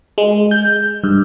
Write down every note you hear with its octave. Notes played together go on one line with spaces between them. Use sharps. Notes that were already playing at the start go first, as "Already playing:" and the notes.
G#3
G6
G2